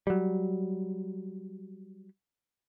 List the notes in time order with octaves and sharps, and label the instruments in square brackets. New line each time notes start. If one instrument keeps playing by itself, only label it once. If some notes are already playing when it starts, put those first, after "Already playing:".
[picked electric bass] F#3 G3